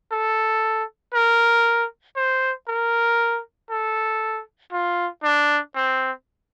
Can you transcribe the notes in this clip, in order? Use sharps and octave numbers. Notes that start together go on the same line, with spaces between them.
A4
A#4
C5
A#4
A4
F4
D4
C4